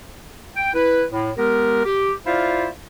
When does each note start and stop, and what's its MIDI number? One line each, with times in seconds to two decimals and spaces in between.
0.56 0.71 79
0.74 1.04 64
0.74 1.04 71
1.10 1.30 45
1.37 1.82 56
1.37 1.82 59
1.37 1.82 67
1.37 1.82 70
1.85 2.13 67
2.26 2.68 64
2.26 2.68 65
2.26 2.68 72
2.26 2.68 74
2.26 2.68 76
2.26 2.68 77